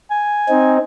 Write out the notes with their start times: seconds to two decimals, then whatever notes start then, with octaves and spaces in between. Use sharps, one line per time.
0.11 G#5
0.49 C4 D#4